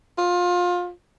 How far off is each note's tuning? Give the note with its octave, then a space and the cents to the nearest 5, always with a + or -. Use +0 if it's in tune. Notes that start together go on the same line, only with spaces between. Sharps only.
F4 +25